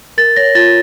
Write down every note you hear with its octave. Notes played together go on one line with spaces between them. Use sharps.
A#4 A6
C#5 A#6
F4 A6